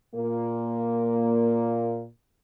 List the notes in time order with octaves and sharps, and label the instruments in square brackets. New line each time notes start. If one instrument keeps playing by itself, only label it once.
[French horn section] A#2 A#3